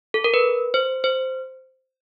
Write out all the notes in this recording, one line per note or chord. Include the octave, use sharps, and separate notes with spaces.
A4
A#4
B4
C5
C5